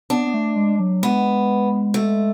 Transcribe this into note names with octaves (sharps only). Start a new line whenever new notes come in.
B3 D4
B3
A3
G#3
F#3
G#3 B3
A3